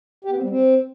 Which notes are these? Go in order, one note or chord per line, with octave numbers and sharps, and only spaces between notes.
G4
B3
C4
G3
C4